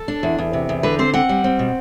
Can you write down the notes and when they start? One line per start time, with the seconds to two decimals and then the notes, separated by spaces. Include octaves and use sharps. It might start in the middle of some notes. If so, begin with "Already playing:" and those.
Already playing: A4
0.08 D4
0.23 E2
0.39 E2
0.53 C3
0.69 E2
0.83 D3 B4
0.99 C4 C5
1.14 C4 F#5
1.29 G3
1.44 C4
1.59 B2